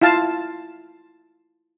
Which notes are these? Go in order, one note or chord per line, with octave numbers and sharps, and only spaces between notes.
E4 F4 F5 A5